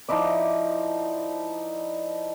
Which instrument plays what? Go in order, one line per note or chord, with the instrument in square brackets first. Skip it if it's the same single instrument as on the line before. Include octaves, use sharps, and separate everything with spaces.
[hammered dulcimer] F3 D#4 E4 D5